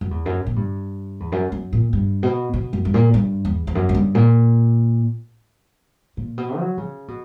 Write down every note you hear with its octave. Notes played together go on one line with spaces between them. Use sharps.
F#2
E2
F#2
A#2
G2
E2
F#2
F#2
A#2
G2
B2
B2
F#2
G2
A#2
G2
E2
E2
F#2
A#2
G2
A#2
A#2
B2
F#3
C#3
B2